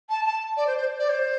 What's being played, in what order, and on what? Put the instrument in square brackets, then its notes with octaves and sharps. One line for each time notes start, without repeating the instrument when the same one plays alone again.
[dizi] A5
A5
D5
C5
C5
D5
C5